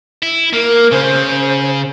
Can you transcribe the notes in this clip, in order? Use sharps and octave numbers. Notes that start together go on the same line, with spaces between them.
E4
A#3 A#4
C#3 C5